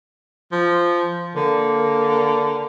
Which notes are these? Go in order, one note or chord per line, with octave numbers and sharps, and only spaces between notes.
F3
D3 A#3